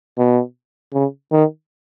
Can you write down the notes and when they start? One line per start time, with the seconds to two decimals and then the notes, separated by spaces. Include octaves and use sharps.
0.18 B2
0.93 C#3
1.32 D#3